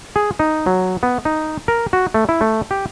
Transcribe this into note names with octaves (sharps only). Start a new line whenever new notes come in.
G#4
D#4
F#3
B3
D#4
A#4
F#4
A3
E4
A3
G4